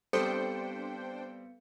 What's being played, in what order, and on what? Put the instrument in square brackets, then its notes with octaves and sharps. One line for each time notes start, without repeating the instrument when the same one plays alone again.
[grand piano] G3 C4 [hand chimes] B3 C#7 [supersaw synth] D4 C5 G5 [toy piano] A4